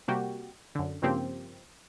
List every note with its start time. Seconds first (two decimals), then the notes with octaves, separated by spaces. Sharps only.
0.08 C3 G3 A#3 F#4 G4
0.75 F#2 D3
1.02 G2 C#3 F3 A#3 C4 G4